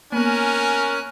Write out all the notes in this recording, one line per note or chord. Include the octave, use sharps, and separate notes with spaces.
A#3 B3 C#4 A#4 G#5 F#6